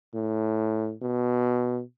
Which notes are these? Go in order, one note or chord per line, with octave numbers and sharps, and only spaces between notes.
A2
B2